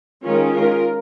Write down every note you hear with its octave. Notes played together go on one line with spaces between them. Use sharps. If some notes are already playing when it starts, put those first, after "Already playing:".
D#3 G#3 C#4 F4 A#4
F4 A#4